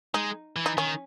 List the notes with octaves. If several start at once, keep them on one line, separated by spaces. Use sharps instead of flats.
G#3 D#4
E3
D#4
D#3 C#4